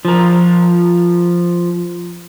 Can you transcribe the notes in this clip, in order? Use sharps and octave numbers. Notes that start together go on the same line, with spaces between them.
F3 A#4